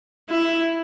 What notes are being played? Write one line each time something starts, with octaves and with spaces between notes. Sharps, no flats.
E4